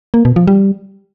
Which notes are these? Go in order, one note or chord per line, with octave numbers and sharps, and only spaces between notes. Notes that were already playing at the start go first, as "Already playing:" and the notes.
A#3
B2
F3
G3